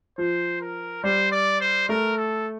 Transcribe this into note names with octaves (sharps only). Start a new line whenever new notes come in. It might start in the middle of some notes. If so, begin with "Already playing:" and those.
F3 C5
A#4
G3 C5
D5
C5
A3 A#4
A4